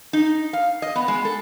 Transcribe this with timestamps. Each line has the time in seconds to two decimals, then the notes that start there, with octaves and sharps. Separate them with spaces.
0.13 D#4
0.53 F5
0.82 D#5
0.96 B3
1.08 G#3
1.25 A4